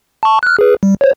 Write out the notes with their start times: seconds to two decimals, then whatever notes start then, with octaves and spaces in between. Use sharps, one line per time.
0.23 A5 C#6
0.43 F6 F#6
0.59 G#4 B4
0.83 G3
1.01 C5 C#5